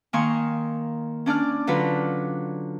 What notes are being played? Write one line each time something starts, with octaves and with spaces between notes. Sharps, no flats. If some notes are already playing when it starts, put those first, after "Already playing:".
D#3 A#3 A#4 G#5 C6 C#6
C#4 D4 D5 F6
D3 F#3 F4 F#4 B4